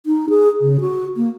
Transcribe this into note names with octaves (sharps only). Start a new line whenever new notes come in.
D#4
G#4
C#3
F#4
A#3